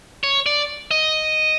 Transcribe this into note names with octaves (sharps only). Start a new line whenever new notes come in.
C#5
D5
D#5